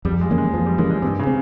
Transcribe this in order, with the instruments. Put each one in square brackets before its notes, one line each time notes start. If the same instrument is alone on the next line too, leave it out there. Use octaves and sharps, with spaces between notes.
[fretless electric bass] F2 [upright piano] G3
[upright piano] G#3
[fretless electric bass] E3 A#3 C#4
[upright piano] G#3
[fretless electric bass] F2 [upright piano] F3
[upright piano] G3
[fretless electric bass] E3 A#3 C#4 [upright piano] G#3
[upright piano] G#3
[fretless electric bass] G2 [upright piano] C3
[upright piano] C#3
[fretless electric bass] C4